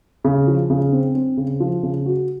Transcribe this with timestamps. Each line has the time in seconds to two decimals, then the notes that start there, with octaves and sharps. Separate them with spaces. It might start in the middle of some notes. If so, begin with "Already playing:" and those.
0.24 C#3
0.47 F3
0.70 C#3
0.92 C4
1.15 C4
1.37 C#3
1.60 F3
1.83 C#3
2.06 F#4